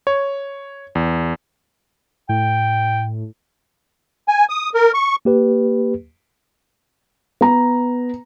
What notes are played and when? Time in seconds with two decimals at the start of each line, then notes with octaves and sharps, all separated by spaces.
0.07 C#5
0.95 E2
2.29 A2 G5
4.28 G#5
4.49 D#6
4.74 A#4
4.94 C#6
5.25 A#3 G4 B4
7.41 B3 A#5